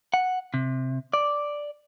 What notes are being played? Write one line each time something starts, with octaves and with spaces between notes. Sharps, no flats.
F#5
C3
D5